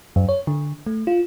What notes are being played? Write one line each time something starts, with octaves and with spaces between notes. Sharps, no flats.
F#2
C#5
D3
A3
F4